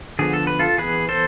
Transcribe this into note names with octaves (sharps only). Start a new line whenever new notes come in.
D3 F3 B3 G#4
A4
B4
F4 A4
E3 B3 G#4 B4
A4 C5